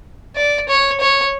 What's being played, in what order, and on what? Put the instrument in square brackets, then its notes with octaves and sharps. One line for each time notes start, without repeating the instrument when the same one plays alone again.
[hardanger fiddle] D5
C#5
C#5